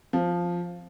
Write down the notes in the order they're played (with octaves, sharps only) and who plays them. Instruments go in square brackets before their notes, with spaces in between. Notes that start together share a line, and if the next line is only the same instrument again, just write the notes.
[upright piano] F3